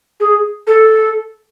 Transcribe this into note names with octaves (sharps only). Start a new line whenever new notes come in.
G#4
A4